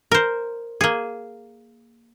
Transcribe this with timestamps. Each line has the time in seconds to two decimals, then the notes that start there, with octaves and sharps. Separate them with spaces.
0.11 A#4 C5
0.81 A#3 G#4